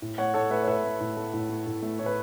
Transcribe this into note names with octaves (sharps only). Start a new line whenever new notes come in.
A2
A3 C#5 F#5
A2 A4 C#5
A3 B4 E5
C#5
A2 B4 E5
A3
A2
A3
A2
A3
A2
A3
A2 C#5
B4